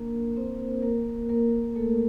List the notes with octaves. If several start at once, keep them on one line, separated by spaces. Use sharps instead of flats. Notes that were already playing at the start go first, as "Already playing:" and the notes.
Already playing: A#3 D4 A#4
C4 C5
A#3 A#4
A#3 A#4
A3 A4